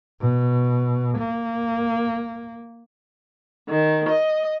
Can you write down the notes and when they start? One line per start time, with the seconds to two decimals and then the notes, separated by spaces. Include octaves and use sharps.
0.21 B2
1.18 A#3
3.69 D#3
4.09 D#5